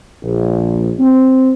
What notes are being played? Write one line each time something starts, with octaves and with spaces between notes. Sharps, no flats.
A#1
C4